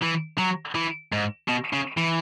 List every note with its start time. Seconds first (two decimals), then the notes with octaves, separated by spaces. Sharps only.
0.02 E3
0.38 F#3
0.75 E3
1.13 G#2
1.49 B2
1.73 C#3
1.97 E3